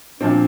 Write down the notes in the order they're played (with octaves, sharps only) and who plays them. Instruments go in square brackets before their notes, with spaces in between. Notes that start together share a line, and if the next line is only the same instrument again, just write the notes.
[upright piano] A#2 F3 C4 [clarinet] D4